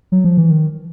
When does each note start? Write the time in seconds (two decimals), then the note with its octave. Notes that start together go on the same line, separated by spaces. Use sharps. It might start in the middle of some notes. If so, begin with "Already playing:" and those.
0.12 F#3
0.24 F3
0.37 E3
0.51 D#3